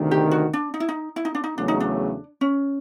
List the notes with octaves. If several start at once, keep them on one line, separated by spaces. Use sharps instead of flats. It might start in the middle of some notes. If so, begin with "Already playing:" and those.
Already playing: D2 C3 D#3
G4
F#4
D4
D#4
E4
D#4
E4
D#4
D4
D#4
E2 C#3 F#3 A3 D4
D#4
D4
C#4